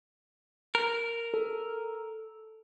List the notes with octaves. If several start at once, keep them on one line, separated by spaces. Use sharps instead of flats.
A#4
A4